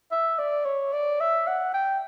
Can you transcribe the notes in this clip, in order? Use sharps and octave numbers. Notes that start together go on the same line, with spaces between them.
E5
D5
C#5
D5
E5
F#5
G5